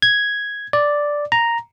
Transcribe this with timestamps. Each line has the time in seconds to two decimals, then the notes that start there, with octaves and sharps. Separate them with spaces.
0.02 G#6
0.73 D5
1.32 A#5